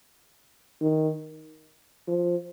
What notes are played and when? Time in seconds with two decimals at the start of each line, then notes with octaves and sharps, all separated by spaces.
0.82 D#3
2.08 F3